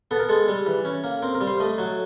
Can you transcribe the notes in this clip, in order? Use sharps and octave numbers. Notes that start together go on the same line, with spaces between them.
B3 A4
A#4
G#3 A4
G3
E3
C#4
A#3
C4 A#4
A#4
G3
C5
A3 D#5
F#3